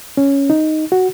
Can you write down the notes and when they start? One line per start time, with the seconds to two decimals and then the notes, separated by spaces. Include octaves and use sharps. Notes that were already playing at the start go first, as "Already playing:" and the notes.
0.17 C#4
0.50 D#4
0.92 F#4